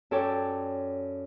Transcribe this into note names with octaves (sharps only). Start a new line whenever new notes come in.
F#2 A4 C#5 D5 G5